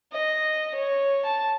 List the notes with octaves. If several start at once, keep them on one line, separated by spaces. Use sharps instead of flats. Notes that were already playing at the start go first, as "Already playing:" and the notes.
D#5
C#5
A5